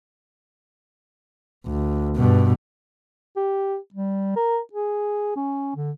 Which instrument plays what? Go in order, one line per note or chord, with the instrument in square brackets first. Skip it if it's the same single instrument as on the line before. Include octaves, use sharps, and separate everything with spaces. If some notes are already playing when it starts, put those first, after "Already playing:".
[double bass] D2
G2 B2
[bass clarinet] G4
G3
A#4
G#4
C#4
D3